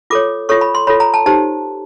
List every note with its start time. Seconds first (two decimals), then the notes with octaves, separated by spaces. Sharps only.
0.10 F4 A4 C#5 D6
0.49 F4 A4 C#5 C#6
0.61 B5
0.75 C6
0.87 F4 A4 C#5 B5
1.00 A#5
1.14 A5
1.26 D#4 G4 C5 A5